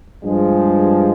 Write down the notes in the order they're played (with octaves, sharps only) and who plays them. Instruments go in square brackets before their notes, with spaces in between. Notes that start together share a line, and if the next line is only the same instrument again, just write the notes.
[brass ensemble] G2 F3 G#3